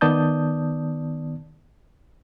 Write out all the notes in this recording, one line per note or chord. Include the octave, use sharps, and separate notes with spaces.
D#3 B3 D5 A5 D#6 G6